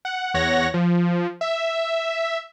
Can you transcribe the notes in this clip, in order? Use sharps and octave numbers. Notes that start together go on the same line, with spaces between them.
F#5
E2 C#5 F#5 A#6
F3
E5